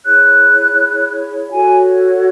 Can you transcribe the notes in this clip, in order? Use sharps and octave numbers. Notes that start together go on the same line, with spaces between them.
E4 G#4 C#5 F#6
F#4 A4 C#5 G#5